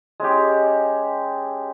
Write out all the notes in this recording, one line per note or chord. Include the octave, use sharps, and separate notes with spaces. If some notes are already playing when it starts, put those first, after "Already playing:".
G#3 C#4 G4